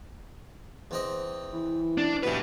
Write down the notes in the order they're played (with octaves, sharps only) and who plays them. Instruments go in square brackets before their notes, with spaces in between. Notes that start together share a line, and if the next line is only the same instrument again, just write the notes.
[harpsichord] E2 C4 D#5
[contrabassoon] E3
[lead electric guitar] D4
[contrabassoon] D2 [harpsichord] B2 E3 [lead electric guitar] G4 B4